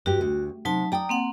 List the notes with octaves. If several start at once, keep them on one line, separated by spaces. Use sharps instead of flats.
G2 F#4 G4
D2
C3 F#3 D#4 A5
D5 G5 A#5 D#6
A#3 C4 F#5